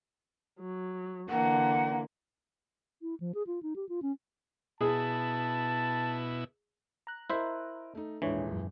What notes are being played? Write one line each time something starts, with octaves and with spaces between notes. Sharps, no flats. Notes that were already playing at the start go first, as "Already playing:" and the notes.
F#3
D3 E3 A#3 F#5
E4
F3
G#4
F4
D#4
G4
F4
C#4
B2 E4 G#4 A5
A#5 F#6
E4 A#4 C5 D#5 E5
A3 D#4
D#1 G#2 E3 D4 C#5
F#2